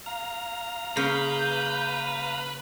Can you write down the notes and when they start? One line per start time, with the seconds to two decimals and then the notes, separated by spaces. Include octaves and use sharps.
0.06 F5 A#5
0.97 C#3 A#3 B4 G6